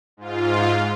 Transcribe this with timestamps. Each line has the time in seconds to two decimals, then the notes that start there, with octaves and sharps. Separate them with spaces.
0.17 G#2 F4